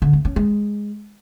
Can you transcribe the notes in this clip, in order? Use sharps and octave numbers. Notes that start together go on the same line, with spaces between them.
D3
A3
C#4
G#3